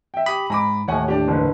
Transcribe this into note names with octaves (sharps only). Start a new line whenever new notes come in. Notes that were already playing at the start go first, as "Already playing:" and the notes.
E5 G5
G4 B5 D#6
G#2 A#5 B5 D6
D#2 A2 C#5 F#5 G#5
D4 G4
F#1 D3 B4